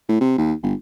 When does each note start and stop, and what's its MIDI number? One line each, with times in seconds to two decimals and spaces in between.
0.09 0.18 45
0.21 0.34 48
0.38 0.53 39
0.63 0.74 31